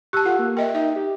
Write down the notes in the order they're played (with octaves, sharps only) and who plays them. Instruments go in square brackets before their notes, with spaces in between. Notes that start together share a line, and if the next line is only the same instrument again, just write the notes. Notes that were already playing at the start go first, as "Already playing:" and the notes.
[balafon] G4 A5 [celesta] E6 F#6
[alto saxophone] F4 [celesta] A4 [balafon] F#5
[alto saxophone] A#3
[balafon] A#4 D#5 E5 [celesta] G5
[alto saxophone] D#4 [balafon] E5
[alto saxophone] G4